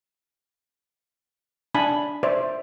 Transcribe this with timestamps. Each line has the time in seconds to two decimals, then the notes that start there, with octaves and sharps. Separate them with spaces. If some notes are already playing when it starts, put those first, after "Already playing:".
1.75 D4 G#5 A5 B5
2.23 C5 D5 E5